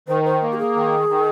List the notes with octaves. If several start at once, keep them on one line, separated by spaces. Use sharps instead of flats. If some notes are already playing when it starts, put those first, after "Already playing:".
D#3 C5
C5
A#3
G4
G#4
D#3
D#3